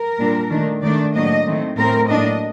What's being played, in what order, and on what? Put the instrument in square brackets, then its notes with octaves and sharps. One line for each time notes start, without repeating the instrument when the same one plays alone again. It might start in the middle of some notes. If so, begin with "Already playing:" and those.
Already playing: [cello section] A#4
A#2 G3 D4
D#3 A3 D4
D#3 A3 D4 D5
A2 F#3 A#3 D4 D#5
D#3 A3 C4
A2 A3 C4 A#4
A2 F#3 A#3 D4 D#5